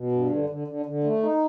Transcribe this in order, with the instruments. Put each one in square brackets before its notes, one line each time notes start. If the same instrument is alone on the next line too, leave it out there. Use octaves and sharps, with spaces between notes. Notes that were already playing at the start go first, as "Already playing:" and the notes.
Already playing: [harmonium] B2
G2
D3
D3
D3
D3
A3
D#4